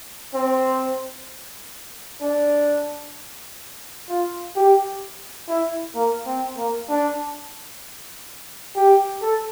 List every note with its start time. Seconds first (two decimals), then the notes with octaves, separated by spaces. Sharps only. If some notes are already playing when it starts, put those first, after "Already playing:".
0.34 C4
2.22 D4
4.09 F4
4.56 G4
5.49 E4
5.95 A#3
6.26 C4
6.57 A#3
6.89 D4
8.76 G4
9.22 A4